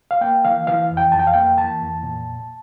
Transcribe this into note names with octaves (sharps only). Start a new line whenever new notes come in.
F5
A#3 G5
E3 F5
E3 F5
F2
G5
F2 A5
G5
F5
A#3 G5
E3 A5
F2
A#2